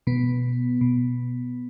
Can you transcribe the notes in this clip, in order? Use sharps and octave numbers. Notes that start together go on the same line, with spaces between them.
B2 B3
B2